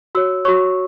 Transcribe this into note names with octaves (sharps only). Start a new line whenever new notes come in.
F#4 C#5 E6
F#4 C#5 C#6